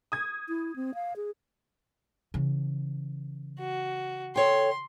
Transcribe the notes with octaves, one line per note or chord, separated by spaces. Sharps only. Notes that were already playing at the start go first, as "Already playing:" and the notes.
D#6 G#6
E4
C4
F5
G#4
C#3 E3
F#4
A4 C#5 G5 C6